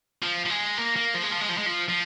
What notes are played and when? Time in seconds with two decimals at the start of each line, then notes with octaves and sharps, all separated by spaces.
0.22 F3
0.45 F3
0.50 G#3
0.78 A#3
0.96 A#3
1.15 F3
1.23 G#3
1.32 F3
1.41 G#3
1.49 F3
1.58 G#3
1.66 F3
1.89 F3